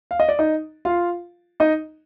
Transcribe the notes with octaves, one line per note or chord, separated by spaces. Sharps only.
F5
D#5
D5
D#4 D#5
F4 F5
D#4 D#5